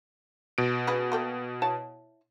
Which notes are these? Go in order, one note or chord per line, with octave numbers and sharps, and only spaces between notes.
B2 D7
C#4 G#4 B4
A#3 A4 G5
E4 C#5 A5